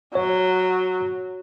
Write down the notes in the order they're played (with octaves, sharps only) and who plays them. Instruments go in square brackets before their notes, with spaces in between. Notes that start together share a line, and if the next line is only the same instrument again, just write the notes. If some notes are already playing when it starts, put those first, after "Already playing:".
[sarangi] F#3 [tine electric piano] C#5